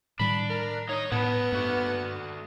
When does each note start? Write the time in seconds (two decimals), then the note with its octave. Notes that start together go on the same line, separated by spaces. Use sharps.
0.19 A2 D#3 G3 D4 B5
0.50 A#4
0.89 D#4 C#5 D#5
1.12 A2 B3 B4 A5
1.52 G2 A3 F#4